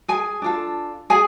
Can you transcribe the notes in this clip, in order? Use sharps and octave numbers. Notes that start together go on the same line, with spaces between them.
G#4 G#5
D4 F4 A4
G#4 G#5